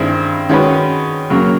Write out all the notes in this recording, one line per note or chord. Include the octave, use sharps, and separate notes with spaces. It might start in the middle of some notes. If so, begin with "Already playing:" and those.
Already playing: G2 D#3 G#3 C4 E4
D#3 G#3 C#4 F#4 B4
C#3 F#3 A#3